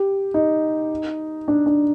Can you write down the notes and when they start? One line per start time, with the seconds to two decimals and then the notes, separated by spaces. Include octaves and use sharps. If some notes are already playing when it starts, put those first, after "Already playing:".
Already playing: G4
0.34 D#4
1.48 D4
1.66 D4